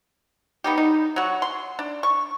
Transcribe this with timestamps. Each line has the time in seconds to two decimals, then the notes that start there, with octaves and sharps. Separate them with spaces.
0.64 B3 D#4 G4
0.78 D#4
1.16 F#3 F#4
1.42 C6
1.79 D4
2.03 C#6